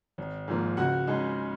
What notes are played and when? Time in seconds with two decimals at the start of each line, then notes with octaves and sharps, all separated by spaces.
0.18 G#1
0.48 G#2 F3 A#3
0.77 C#2 F#4 F#5
1.07 C#3 G#3 D#4